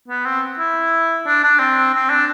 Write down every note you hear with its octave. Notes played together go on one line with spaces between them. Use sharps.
B3
C4
E4
D4
D4
C4
C4
D4